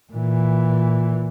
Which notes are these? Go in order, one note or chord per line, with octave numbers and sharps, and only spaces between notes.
A#2 E3